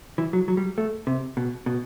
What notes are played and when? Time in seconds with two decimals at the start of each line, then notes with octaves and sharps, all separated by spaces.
0.18 E3
0.33 F#3
0.48 F#3
0.57 G3
0.78 A3
1.07 C3
1.37 B2
1.66 B2